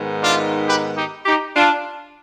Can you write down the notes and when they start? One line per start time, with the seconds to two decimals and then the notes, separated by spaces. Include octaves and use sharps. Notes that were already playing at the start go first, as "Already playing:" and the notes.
Already playing: G#2 D#3 B3
0.21 D4 F4
0.66 G4 B4
0.96 D#4 G4
1.25 D#4 G4
1.56 D4 F4